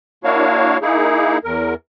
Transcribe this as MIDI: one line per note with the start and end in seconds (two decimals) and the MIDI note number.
0.24 0.78 58
0.24 0.78 62
0.24 0.78 64
0.24 0.78 66
0.24 0.78 73
0.24 0.78 77
0.82 1.38 58
0.82 1.38 63
0.82 1.38 64
0.82 1.38 68
1.44 1.74 40
1.44 1.74 70